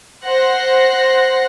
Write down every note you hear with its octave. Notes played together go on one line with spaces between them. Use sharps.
C5 F#5 F#6 A#6 C7